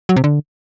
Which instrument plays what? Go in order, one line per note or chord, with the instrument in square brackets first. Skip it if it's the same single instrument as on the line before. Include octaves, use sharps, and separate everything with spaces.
[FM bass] F#3
C3
D3